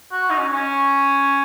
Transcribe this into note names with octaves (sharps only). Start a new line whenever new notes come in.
F#4
D#4
C#4
C#4